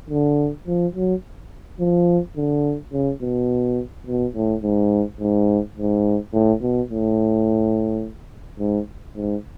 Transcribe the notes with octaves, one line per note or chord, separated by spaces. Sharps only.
D3
F3
F#3
F3
D3
C#3
B2
B2
A2
G#2
G#2
G#2
A2
B2
A2
G#2
G#2